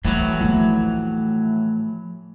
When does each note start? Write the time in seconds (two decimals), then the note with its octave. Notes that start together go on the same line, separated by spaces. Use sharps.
0.05 A2 E3 F#3 A3
0.41 F3 A3